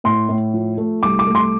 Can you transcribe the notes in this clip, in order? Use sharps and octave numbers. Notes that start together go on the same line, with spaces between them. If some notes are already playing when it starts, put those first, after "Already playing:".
A2 C6
A2
F3
A3
C2 D6
D6
A3
C6